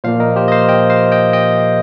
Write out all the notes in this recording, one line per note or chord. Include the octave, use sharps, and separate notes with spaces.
A#2 F3 A#3 C5 F5
A#4 D#5
G4 C5
D#5
C5 F5
D#5 G5
C5 F5
D#5 G5
D#5 G5